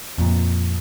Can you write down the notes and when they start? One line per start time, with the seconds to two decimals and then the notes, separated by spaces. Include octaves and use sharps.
0.18 F2 A#2